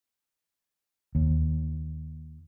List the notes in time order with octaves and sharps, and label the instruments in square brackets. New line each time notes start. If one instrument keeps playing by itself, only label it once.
[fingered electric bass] D#2